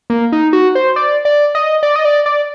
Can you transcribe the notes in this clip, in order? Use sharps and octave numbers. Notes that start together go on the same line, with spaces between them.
A#3
D#4
F#4
C5
D5
D5
D#5
D5
D#5
D5
D5